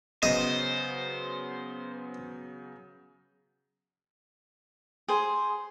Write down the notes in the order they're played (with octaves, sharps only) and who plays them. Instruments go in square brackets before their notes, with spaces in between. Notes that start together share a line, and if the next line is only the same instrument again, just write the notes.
[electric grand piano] C#3 F#3 B3 [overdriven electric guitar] C5 [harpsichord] D#5
[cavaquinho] G#4 C5